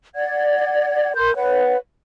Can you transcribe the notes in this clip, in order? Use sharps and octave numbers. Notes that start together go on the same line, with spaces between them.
D5 F#5 G#6
A#4 C6 G6
B4 C#5 F#5